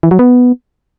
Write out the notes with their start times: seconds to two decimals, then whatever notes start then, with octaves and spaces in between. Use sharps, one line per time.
0.03 E3
0.11 F#3
0.19 B3